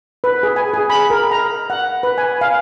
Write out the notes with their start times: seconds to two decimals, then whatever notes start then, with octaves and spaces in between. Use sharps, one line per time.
0.24 B4
0.43 G#4
0.56 G#5
0.74 G#4
0.90 B5
1.10 A#4
1.31 A#5
1.70 F#5
2.03 B4
2.18 G#5
2.41 F5